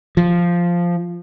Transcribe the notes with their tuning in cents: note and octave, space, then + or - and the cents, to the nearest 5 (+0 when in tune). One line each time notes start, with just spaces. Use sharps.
F3 -5